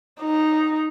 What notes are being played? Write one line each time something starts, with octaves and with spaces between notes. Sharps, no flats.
D#4